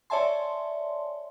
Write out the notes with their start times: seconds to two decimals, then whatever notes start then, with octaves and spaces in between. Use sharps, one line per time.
0.10 C#5 D5 E5 G#5 A5 C6